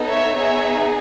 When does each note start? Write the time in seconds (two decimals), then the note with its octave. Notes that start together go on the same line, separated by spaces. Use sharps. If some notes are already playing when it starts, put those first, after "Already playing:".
Already playing: B3 D#4 A4
0.08 C#5 E5
0.36 B3 D#4 G#4 C#5 E5